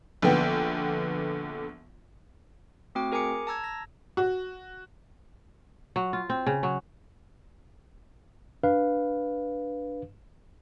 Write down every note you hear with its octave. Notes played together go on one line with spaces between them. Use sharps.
A#1 D3 B3 G5
A3 C4 F#4 G5 D6
G#4 A#4 G#5 A#5 D6 C#7
A5 A#5 E6 G#6
A#6
F#4
F#3
F4
C4
C#3
F#3
D4 B4 F5